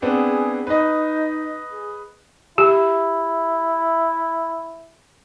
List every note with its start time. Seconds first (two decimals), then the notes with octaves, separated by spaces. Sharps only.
0.02 B3 C4 D4 G#4
0.67 D#4 B4 D#5
1.72 G#4
2.58 E4 G4